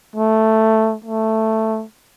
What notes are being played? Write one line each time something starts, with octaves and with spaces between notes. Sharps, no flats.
A3
A3